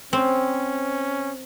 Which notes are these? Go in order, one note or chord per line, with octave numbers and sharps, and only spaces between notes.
C4 C#4